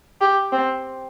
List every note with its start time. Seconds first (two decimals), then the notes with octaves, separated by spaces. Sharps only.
0.21 G4
0.52 C4